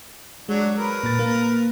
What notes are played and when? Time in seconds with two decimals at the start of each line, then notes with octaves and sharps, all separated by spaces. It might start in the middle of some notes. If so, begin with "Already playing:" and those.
0.49 F#3 G#3 D4
0.77 A#4 B4
1.03 A#2 A6
1.19 A#3